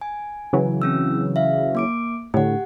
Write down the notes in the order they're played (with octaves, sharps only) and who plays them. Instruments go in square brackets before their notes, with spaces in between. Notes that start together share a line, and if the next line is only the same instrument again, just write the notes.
[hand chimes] G#5
[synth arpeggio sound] C#3 E3 F#3
[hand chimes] C4 C#4 E6
E5 F5
A#3 D6 D7
[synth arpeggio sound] A2 D3 [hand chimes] G4 F#5